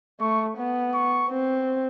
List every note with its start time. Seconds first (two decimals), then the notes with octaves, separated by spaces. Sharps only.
0.20 A3 C#6
0.58 B3
0.94 C#6
1.30 C4